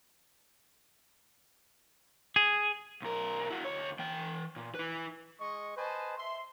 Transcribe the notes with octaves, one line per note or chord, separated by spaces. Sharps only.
G#4
B1 A#4
E4 F#4
D2 C#5
E3 G5
A#2
E4 B4
G#3 D#5 C#6
B4 C5 D#5 G#5 A5
E5 C6